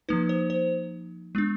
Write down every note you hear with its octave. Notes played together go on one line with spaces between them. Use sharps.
F3 A#3 D#4 B4
C5
C5
G#3 B3 D4